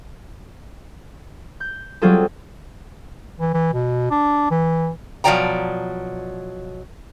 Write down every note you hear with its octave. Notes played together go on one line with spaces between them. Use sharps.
G6
F#3 G3 C4 F4 G#4 A4
E3
E3
B2
D4
E3
B2 F3 F#3 D5 G5 A#5